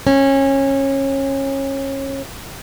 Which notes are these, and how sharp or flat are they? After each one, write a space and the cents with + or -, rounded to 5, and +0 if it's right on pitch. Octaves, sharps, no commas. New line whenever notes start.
C#4 -25